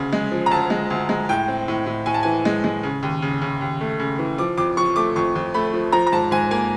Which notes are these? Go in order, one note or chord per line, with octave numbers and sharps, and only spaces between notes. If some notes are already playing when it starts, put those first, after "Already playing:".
Already playing: D2 C#3
G#3
F3
A#5
D2 A5
G#3
D2
G#3
A2 G5
C4
A2
A2
A2 G#5
A5
E3 G#5
G#3
G#3
C#3
D#2
C#3
C#3
D#2
A3
C#3
E3
F3 D6
F2 D6
F3 C#6
A3 D6
F2 C#6
F2
A3 B5
F3
F3 A#5
A#5
G#2 A5
G#2 G#5
A#3 G#5